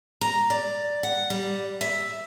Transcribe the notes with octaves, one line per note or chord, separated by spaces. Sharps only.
A#5
D5
F#5
G3
E5